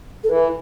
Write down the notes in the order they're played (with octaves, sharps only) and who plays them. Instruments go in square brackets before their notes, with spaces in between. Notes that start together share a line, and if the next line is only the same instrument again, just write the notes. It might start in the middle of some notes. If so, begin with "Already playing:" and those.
[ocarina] A4
[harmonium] E3 [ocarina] B4